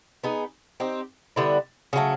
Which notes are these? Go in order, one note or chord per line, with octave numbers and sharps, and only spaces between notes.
B3 D#4 G#4
C4 D#4 G4
D3 G3 B3 E4
C#3 F#3 A3